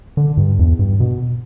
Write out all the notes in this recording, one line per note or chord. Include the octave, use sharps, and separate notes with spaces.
D3
G2
E2
G2
B2